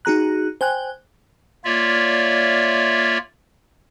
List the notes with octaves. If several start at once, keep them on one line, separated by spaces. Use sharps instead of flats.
D#4 F#4 G#4 A#5 F#6
C5 G5 G#5 F#6
A#3 F4 C#5 D5 E5